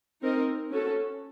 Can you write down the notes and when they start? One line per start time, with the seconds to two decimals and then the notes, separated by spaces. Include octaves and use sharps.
0.23 C4 D#4 A#4 D#5
0.71 C#4 F#4 A4